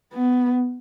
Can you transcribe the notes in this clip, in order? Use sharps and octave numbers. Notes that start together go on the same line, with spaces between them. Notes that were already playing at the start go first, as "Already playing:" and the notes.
B3